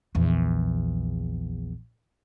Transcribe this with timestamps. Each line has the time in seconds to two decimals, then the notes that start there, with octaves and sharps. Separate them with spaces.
0.15 A#1 E2